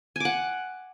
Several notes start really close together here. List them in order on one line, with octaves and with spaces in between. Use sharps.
G#5 D6 F#5